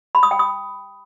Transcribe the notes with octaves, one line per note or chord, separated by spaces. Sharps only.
B5
D#6
G5
D#6